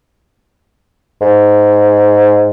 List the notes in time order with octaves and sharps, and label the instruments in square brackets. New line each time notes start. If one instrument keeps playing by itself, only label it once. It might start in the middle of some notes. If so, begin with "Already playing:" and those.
[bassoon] G#2